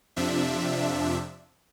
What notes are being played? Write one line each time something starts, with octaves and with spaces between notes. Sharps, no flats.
F2 C3 F3 D4 E5